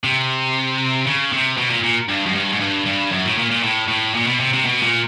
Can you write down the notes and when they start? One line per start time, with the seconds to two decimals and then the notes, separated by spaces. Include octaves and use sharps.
0.04 C3
1.06 C#3
1.32 C3
1.57 B2
1.70 A#2
1.83 A#2
2.09 G2
2.26 F#2
2.35 G2
2.52 G#2
2.60 G2
2.86 G2
3.11 F#2
3.25 A2
3.38 A#2
3.51 A#2
3.63 A2
3.88 A2
4.14 A#2
4.27 B2
4.40 C3
4.53 C3
4.65 B2
4.82 A#2